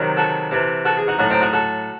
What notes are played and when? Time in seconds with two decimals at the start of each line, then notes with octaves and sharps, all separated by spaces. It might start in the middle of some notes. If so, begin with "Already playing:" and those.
Already playing: C3 D#3 F#3
0.17 F#4 A4
0.51 C3 E3
0.85 F#4 A4
0.97 G#4
1.07 D#4 F#4
1.18 A2 F#3 D#4 F#4
1.30 C4 D#4
1.41 D#4 F#4
1.53 F#4 A4